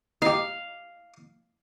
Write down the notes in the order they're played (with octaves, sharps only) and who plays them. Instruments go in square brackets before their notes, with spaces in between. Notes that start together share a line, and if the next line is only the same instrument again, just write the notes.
[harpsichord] D#4 G4 [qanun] F5